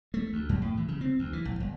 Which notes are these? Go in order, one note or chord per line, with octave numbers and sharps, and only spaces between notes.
A3
D2
F#2
A2
E3
C#3
C4
D2
E3
A#1
G1